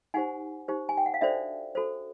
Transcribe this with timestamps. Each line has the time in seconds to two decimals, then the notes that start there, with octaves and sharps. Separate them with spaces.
0.14 D#4 G4 C5 F#5 G#5
0.68 D#4 G4 C5
0.89 G#5
0.97 G5
1.06 F#5
1.14 F5
1.21 D4 F#4 A4 C5 D5 E5
1.75 D4 F#4 A4 C5